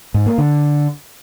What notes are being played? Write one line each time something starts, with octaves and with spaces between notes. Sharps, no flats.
G#2
A#3
D3